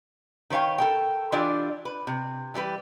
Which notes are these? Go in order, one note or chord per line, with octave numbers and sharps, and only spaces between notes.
D#3 B4 C#5 F5 G5
A4 A#4 G5
E3 D4 F4 G4 D5 E5
B4
C3
E3 G3 G4 B4